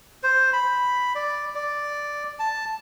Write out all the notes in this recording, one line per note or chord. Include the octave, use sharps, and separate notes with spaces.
C5
B5
D5
D5
A5